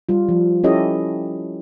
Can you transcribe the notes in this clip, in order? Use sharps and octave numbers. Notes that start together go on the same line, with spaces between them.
G3 F4
F3
C#4 E4 G4 A4 C#5 D#5